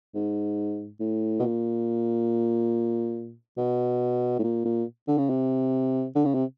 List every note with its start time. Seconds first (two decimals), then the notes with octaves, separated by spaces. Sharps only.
0.15 G#2
1.00 A2
1.39 B2
1.42 A#2
3.58 B2
4.39 A2
4.44 A#2
4.65 A#2
5.08 D3
5.18 C#3
5.30 C3
6.16 D3
6.25 C#3
6.35 C3